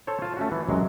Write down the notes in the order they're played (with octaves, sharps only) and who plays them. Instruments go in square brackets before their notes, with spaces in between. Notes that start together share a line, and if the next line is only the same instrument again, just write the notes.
[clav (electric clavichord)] A4 C5 C#5
F4 A5
A3 C#4 F#4
E3
C#2 F#2 C3 F#3 G#3